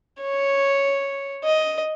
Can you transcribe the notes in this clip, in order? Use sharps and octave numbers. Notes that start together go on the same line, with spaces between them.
C#5
D#5